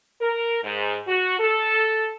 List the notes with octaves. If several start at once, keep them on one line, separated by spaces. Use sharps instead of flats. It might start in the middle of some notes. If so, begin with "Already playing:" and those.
A#4
G#2
F#4
A4